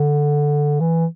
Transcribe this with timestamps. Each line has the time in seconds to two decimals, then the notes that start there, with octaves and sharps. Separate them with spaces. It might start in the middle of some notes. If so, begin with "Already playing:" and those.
Already playing: D3
0.80 E3